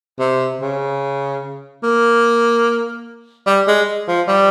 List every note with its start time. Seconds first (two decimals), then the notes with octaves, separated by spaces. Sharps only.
0.20 C3
0.61 C#3
1.83 A#3
3.46 G3
3.67 G#3
4.08 F3
4.28 G3